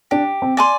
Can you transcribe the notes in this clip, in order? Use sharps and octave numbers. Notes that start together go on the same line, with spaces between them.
D4 G4
C4
D5 G#5 C6